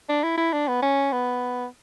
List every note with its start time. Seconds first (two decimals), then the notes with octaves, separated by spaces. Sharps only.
0.09 D4
0.23 E4
0.38 E4
0.53 D4
0.68 B3
0.82 C#4
1.12 B3